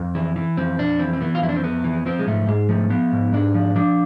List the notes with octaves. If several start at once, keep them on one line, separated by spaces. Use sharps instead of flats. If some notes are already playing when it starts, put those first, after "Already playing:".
Already playing: F2 C4
E3
E3
F2 C4
F2 D4
E3 C4
C4
E3 B3
F4
F2 E4
D4
C4
F2 B3
E3
F3 C4
G#3
G#2 A3
G#2 G#3
F3 A3
F3 B3
G#2
G#2 D4
F3
F3 D4